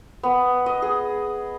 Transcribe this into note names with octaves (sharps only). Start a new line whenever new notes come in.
B3
D#5
G#4